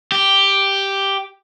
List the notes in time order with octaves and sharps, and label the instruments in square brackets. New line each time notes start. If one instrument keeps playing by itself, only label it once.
[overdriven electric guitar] G4